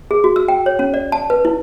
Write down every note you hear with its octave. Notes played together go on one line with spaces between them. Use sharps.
G#4
F#4
E6
G5
C#5
C#4
D5
A5
B4
E4